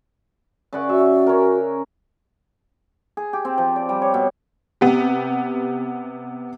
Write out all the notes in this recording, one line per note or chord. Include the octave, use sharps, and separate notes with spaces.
C#3 D5 F#5
F#4 E5
C#4 A#4
G#4
G4
C4
F3
D5
G3
C#5
B2
C3 B3 G4